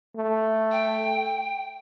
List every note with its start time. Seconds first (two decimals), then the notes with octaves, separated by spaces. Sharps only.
0.17 A3
0.72 G5